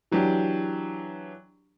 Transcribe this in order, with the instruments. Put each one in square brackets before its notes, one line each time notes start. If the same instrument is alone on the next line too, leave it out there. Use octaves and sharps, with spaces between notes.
[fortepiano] E3 F#3 D4 G4